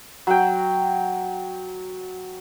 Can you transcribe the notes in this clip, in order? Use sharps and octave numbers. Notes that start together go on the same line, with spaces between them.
F#3 G5